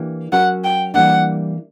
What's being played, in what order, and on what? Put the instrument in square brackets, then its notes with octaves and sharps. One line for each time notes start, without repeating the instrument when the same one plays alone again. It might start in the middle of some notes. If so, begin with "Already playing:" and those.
Already playing: [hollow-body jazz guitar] E3 A#3 D4 G4
[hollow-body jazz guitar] F#3 C#4 F#4 A#4 [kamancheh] F#5
[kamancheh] G5
[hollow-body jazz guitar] E3 G3 A#3 D4 [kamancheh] F#5